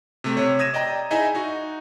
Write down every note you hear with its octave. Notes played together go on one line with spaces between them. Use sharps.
C3 A3
C3 C#5
D#6 G#6 A#6 D#7 E7
D5 D#5 G5 A#5
D#4 E4 G#4 D#5 E5 G#5
D#4 F#4